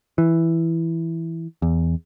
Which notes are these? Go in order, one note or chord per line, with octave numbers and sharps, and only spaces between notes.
E3
E2